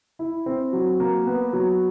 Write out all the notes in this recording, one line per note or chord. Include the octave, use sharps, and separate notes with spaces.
E4
C4
F#3
A#3
B3
F#3